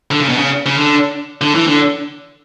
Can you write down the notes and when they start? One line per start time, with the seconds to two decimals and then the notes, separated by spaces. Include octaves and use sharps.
0.11 D3
0.20 C#3
0.29 B2
0.38 C#3
0.66 C#3
0.76 D3
1.41 D3
1.55 E3
1.67 D3